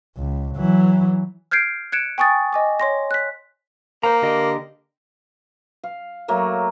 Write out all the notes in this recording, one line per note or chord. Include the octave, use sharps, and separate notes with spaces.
C#2
E3 F#3
F6 G6 G#6 C7 D7
F#6 G#6 C#7 D7 E7
G5 G#5 C#6 D#6 A6
D#5 G#5 D6
C#5 C6 A#6
F#6 B6
A#3 C5 A#5
D3 G4 D#5
F5
F#3 A3 A#3 C#5